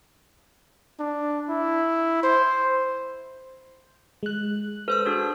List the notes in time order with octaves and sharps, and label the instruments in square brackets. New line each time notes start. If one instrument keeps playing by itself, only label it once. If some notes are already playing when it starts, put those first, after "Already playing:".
[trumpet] D4
E4
C5
[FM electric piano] G#3 F#6
[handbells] A4 C5 E6 [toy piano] B4
[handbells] D4 F#4 G#4